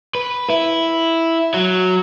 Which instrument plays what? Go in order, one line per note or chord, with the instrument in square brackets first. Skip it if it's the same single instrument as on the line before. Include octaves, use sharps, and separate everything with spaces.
[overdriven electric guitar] B4
E4
F#3